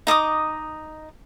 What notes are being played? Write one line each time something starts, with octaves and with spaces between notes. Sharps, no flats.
D#4 D#5 D6 D#6